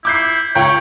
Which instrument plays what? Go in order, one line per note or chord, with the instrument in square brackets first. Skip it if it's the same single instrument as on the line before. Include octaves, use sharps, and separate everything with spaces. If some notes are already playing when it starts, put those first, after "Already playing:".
[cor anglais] E4 [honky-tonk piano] D6 G6 C7
[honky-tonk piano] C#2 G5 G6 [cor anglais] C#5